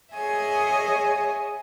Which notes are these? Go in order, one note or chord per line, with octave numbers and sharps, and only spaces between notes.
G#4 C#5 D#5 E5 G#5